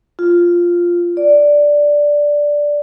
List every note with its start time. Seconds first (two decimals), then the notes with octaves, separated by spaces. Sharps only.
0.19 F4
1.17 D5